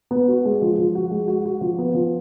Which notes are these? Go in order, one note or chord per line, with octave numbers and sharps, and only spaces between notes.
B3
F#4
G#3
F3
F3
F#4
G#3
F#4
F#4
F3
B3
F3